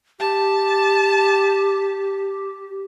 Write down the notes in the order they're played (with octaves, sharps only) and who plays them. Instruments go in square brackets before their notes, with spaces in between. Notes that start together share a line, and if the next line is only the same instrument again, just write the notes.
[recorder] G4 [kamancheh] A5